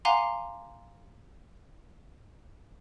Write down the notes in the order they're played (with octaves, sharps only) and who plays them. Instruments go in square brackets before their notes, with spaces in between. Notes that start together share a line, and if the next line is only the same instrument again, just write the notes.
[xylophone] F5 F#5 G#5 A#5 C6 D6